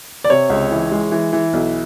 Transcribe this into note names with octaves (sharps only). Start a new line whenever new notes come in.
D5
C3 C#5
C#2
E3
G#3
E3
E3
B1